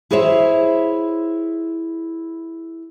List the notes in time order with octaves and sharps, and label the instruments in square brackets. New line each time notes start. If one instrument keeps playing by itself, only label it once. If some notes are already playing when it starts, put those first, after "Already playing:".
[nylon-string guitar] E4 G#4 C5 C#5 E5